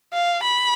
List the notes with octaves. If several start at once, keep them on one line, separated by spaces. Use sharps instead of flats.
F5
B5